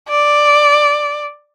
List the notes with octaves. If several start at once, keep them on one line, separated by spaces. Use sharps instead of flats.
D5